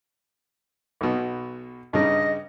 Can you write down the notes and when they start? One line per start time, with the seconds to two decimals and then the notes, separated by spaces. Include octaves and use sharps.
1.01 B1 B2
1.93 G2 C#3 D#4 D#5